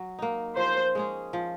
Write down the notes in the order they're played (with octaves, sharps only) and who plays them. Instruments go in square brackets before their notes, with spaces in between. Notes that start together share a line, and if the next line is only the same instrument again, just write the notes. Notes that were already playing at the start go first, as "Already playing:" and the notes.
Already playing: [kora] F#3
A#3 D#4
[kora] F3 [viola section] C5
[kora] G#3 C#4 G#4
F3